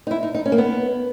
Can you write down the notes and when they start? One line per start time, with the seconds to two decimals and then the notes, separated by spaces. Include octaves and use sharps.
0.07 D#4
0.11 E4
0.23 D#4
0.35 D#4
0.46 C#4
0.52 A#3
0.58 B3